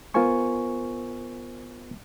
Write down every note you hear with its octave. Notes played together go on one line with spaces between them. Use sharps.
B3 F4 A#4 C5 G#5 C#6